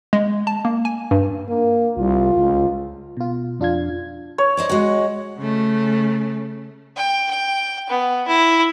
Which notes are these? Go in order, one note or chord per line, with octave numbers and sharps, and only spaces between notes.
G#3
A5
A#3
G#5
G2
A#3
C2 F4
C#2
B2 F4
F2 D4 F4 F5 G#6
C#5
D#4 C5 D5
G#3 F#4
C#3 A3
G5
G5
B3
E4